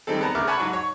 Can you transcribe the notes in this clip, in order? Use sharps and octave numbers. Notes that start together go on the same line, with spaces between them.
D#3 G3 G#3 C4 A4
B3 F#5 A5 A#5
D2 C#3 A#4 E5 D6 F6
C#5 F#5 G#5 A5 B5 C#6
G#2 F#3
C#5